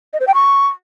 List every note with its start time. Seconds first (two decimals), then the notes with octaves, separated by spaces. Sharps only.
0.13 D#5
0.20 C5
0.27 G5
0.34 C#6